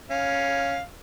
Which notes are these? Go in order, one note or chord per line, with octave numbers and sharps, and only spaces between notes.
C#4 F5